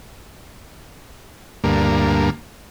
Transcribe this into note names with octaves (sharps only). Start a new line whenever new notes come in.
D2 G2 A#3